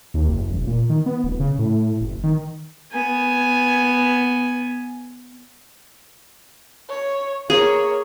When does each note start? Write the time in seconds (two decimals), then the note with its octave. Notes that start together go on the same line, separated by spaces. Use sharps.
0.14 D#2
0.29 F#1
0.52 E1
0.67 A#2
0.90 D#3
1.06 B3
1.24 D1
1.40 C#3
1.59 A2
2.01 F#1
2.24 D#3
2.92 B3 G#5
6.89 C#5
7.50 A#3 G#4 C#5